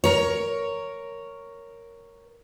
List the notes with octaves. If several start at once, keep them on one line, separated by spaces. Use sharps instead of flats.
A#4 C#5